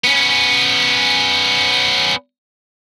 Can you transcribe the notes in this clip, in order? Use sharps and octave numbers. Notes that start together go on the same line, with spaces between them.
B3 C#4